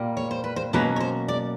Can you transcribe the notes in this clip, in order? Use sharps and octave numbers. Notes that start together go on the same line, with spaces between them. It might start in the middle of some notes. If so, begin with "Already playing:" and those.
Already playing: A#2 G3 A#3
C#5
C5
B4
C5
B2 F#3 A#3 C#4 B4
C#5
C5
D5